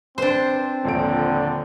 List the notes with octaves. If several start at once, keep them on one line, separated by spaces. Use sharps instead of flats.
C4 D4 B4 C5 C6
D#1 A#1 D3 D7